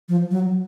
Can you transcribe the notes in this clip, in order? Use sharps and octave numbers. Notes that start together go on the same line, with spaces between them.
F3
F#3